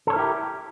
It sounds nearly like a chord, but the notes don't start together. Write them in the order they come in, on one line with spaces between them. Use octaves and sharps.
A4 C#5 A#4 E4 G4